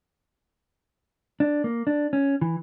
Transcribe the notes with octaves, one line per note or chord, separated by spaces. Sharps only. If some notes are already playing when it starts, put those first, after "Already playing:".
D4
A#3
D4
C#4
E3